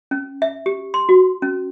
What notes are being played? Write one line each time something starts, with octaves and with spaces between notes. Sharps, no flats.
C#4
E5
G4
C6
F#4
C#4